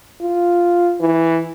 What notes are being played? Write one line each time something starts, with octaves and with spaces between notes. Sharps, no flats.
F4
E3